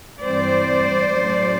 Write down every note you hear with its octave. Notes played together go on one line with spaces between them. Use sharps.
G2 E3 G3 C4 C5 D5
A2 F#3 A3 C#4